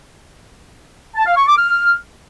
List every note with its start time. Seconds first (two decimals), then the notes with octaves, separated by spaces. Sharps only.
1.16 A5
1.26 F5
1.37 C#6
1.47 D6
1.58 F6